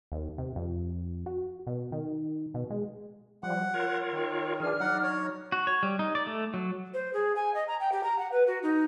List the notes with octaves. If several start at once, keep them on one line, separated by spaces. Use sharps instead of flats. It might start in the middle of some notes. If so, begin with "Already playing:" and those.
D#2
C3
F2
F#4
B2
D#3
B2
G#3
F3 G3 F#5
F4 A#4 C#5
D#3
E3 D4 G#4 F6
F#3 D#4 F#5
C#5
F#4
C#5
G3
D#4
D5
A3
F#3
C5
G#4
G#5
D#5
A#5
G5
G4
A#5
F#5
B4
F#4
D#4